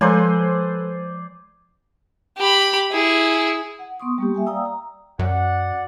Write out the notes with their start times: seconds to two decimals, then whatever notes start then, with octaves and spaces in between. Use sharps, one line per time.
0.01 F3 G#3 A4 B4 C5 D5 G#5 B5
2.37 G4 B5
2.92 E4 G#4
3.79 F#5
4.00 B3 C6 C#6 D#6
4.18 G3 A#3 G4
4.35 E5 G5 G#5
4.46 D5 F5 G5 A#5 D#6 E6
4.65 A#5
5.19 F#2 F#4 D5 F#5